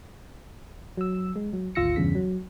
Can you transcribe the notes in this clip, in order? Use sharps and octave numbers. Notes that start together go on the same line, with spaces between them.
F#3 E6
G#3
F#3
G#1 D2 F4 E6 A#6 C#7
E2 G2 C#3 B6
F#3